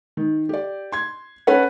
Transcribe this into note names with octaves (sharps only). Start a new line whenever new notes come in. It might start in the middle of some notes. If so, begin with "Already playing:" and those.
D#3
G4 D5
C6 G#6
C#4 A4 B4 C#5 F#5